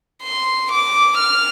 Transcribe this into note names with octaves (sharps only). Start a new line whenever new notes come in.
C6
D6
F6